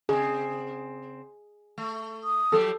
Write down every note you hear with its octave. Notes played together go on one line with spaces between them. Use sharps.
C#3 C4 G#4
A3
D#6
F3 F#3 G4 A4